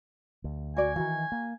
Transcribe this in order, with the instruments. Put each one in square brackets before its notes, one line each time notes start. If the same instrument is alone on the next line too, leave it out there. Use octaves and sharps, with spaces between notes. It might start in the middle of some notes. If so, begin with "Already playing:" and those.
[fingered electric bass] D2
[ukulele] F#4 D5 [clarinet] G#5
[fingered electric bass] D#3 E3 [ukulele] F#4
[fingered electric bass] A#3